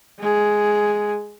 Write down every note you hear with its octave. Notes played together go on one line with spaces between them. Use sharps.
G#3 G#4